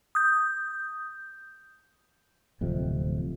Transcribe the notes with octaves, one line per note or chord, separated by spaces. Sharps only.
D#6 G6
D1 F2 C3